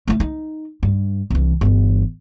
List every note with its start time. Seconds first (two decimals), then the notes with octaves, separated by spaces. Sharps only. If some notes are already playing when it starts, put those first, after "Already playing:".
0.08 A3 E4
0.20 D#4
0.83 G2
1.30 C2 E3
1.61 G1 E3